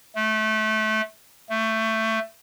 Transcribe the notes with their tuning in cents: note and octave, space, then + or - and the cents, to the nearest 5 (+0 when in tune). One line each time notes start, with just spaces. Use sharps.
A3 -20
A3 +15